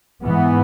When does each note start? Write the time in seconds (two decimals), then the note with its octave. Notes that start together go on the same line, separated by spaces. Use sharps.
0.24 G#2 E3 B3